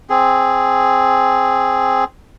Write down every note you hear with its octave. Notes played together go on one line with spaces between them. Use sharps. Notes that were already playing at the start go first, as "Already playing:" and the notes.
C4 G#4